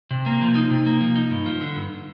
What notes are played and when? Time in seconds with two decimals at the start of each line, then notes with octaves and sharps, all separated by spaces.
0.11 C3
0.26 A#3
0.41 F3
0.55 D#4
0.71 C3
0.86 A#3
1.01 F3
1.16 D#4
1.31 G2
1.46 F3
1.61 D3
1.76 G2